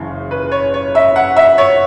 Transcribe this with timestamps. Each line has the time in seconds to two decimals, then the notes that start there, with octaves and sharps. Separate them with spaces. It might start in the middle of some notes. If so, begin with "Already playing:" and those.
Already playing: F#1 F#2 C#3 E3
0.31 B4
0.52 C#5
0.74 C#5
0.95 E5
1.16 F#5
1.36 E5
1.58 C#5